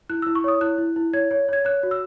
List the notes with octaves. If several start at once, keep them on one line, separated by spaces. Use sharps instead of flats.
E4 F#6
E4 E6
C#6
C#5 D#6
E4 F#6
E4
E4
C#5 G#6
C#5
C#5 G#6
C#5 F#6
F#4
E6